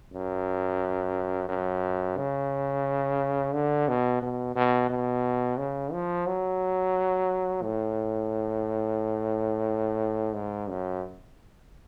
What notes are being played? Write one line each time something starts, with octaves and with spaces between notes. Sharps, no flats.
F#2
F#2
C#3
D3
B2
B2
B2
B2
C#3
F3
F#3
A2
G#2
F#2